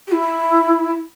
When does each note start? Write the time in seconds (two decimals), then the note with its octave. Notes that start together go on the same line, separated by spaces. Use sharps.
0.08 G4
0.12 E4